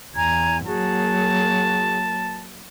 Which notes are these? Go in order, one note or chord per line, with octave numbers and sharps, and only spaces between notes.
E2 G#5 A#5 G#6
F#3 A#3 F#4 G#4 A5